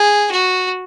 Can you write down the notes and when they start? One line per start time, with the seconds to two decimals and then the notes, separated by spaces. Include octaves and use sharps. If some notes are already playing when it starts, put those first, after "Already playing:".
Already playing: G#4
0.31 F#4